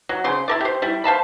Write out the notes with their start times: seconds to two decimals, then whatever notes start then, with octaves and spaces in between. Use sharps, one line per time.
0.09 F#3
0.24 C#3 C5 C6
0.48 E4 A#4 D5
0.61 G4 C5
0.82 G3 E4
1.04 C5 F5 A5 B5